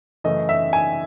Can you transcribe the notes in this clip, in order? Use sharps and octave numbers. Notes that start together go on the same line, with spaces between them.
F#2 C#3 E3 A3 D#5
E5
G#5